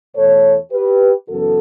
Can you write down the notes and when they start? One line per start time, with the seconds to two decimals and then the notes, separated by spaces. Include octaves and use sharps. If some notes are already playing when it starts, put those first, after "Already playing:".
0.15 E2 B2 A3 A4 C#5
0.71 G4 B4
1.28 F#2 C#3 E3 B3 F#4 A4